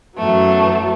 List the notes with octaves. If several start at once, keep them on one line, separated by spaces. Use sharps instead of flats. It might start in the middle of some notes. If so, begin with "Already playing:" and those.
F#2 E3 F#3 A3 B3